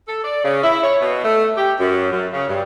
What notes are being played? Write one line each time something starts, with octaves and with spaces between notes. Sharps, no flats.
A4
D5
C#3
E4
C#5
B2
A3
G4
F#2
F#2
C#3
G2